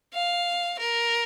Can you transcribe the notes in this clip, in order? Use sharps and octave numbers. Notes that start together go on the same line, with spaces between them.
F5
A#4